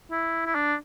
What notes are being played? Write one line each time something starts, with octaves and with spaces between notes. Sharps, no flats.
E4
E4
D4